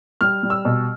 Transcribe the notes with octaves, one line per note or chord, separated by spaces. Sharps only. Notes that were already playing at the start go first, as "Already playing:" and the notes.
G3 F6
G3
E6
B2